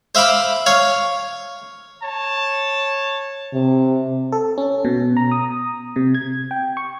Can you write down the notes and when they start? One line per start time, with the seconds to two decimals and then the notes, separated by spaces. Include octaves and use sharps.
0.15 C5 E5 F5 B5 D6
0.66 C#5 F5
2.03 C#5 A5
3.53 C3
4.32 A4
4.58 C#4
4.85 B2
5.17 A#5
5.31 D#6
5.96 C3
6.15 G#6
6.51 G5
6.77 C#6